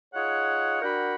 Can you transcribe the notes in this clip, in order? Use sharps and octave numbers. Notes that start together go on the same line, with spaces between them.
D#4 F4 G#4 C#5 F#5
D4 F#4 A#4 F#5 G5 B5